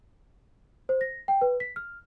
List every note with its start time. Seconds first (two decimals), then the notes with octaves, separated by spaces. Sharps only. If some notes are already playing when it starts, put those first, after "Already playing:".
0.89 C5
1.01 A#6
1.28 G5
1.41 B4
1.60 B6
1.76 F6